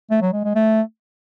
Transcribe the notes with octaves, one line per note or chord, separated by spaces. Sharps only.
A3
F#3
G#3
G#3
A3